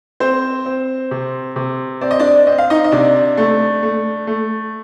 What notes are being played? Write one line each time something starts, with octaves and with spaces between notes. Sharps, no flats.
C4 C5
C4
C3
C3
C4 D5
D#5
D4 D5
C4 D#5
F5
D#4 D#5
D#5
C3 D4 D5
A3
A3
A3